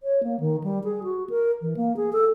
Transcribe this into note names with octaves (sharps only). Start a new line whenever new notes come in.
C#5
A#3
D#3
G3
G#4
F#4
A#4
E3
A#3
G#4
A4